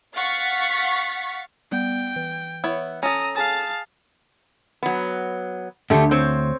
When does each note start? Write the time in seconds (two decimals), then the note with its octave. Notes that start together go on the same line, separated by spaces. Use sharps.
0.14 F5 F#5 C#6 A6 B6
1.72 G3 B3 G5 G6
2.16 E3
2.64 B3 E4 C#5
3.03 C#4 A4 A#5 D#6
3.36 G#4 F5 G#5 A5 D#6
4.83 F#3 B3
5.90 D2 G#2 D3 A3 G4
6.11 C4 C5 C#5